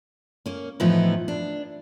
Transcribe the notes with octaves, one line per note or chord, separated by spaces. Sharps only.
A#3 C#4
A2 E3 F3 B3 D#4 E4
D4